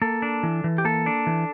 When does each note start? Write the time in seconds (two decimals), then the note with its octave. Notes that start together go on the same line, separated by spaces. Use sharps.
0.01 A#3 A4
0.22 D4
0.43 E3
0.64 E3
0.78 G4
0.84 A#3 A4
1.06 D4
1.27 E3